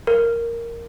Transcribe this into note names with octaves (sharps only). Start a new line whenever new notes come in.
A#4